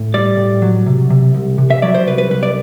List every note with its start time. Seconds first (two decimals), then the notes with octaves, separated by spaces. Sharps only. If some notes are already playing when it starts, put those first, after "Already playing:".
Already playing: A2
0.14 G3 D5
0.37 A2
0.62 F#3
0.86 C3
1.10 C3
1.35 C2
1.58 C3
1.70 E5
1.82 F#3 D5
1.94 C5
2.07 C2 B4
2.18 B4
2.30 C2 B4
2.43 D5